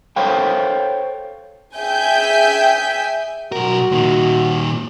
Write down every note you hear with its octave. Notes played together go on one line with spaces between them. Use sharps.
A4 C5 C#5 F5 G5
G#4 E5 G5 G#5 G6
B1 F#4 A#4
A#2 D#3